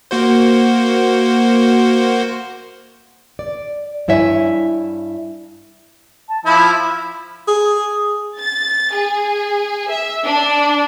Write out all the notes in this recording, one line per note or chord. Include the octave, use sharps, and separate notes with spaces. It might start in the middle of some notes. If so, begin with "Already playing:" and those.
A#3 F#4 C5
D5
G2 E4 C#5 E5 G#5
A5
F3 E4 B5
G#4
A6
G#4
E5
D4